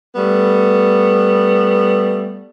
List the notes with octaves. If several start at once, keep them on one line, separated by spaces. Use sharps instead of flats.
G3 A3 B3